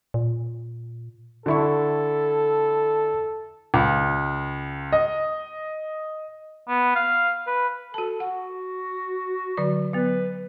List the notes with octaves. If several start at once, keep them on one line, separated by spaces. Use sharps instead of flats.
A#2
D3 E4 A4 C#6
C#2
D#5
B3
F5
B4
F#4 A4 A5
F#4 F#5
D3 F#3 D5
F#3 B3 B4